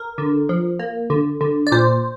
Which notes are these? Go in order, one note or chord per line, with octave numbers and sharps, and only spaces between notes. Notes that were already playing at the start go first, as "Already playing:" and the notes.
Already playing: A#4
D3
F3
A#3
D3
D3
D5
A#2 C5